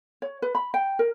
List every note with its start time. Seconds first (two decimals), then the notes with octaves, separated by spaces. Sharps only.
0.22 C#5
0.42 B4
0.55 B5
0.74 G5
0.99 A#4